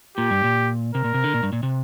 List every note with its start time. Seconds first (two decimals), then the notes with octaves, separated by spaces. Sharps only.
0.17 A#2 G4
0.31 G2
0.44 A#2
0.95 C3 A#4
1.04 A#2
1.14 C3
1.24 D3
1.34 A#2
1.43 G2
1.53 A#2
1.63 C3